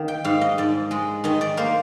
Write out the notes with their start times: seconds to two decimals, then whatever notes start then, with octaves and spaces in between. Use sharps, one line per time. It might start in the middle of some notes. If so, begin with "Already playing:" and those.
Already playing: D#3 A#3
0.08 G5
0.24 G#2 F5
0.41 D#5
0.58 G#2 D5
0.91 G#3 D#5
1.24 D#3 D#5
1.41 D5
1.57 A#3 C5